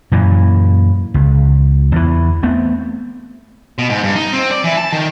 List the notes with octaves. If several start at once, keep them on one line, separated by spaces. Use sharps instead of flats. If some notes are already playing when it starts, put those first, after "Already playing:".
F#2 A#2 E3
C#2
E2 E3
A3 B3 C4
B2
G#2
G2
D#4
C4
D5
E3
A5
D#3